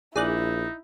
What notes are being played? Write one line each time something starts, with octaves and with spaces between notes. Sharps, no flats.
A#1 D#4 E4 G#4 D5 F#6